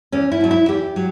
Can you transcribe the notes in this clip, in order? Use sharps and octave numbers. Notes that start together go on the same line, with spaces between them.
E2 C#4
E4
B2 F#3
E4
E2 G4
F#3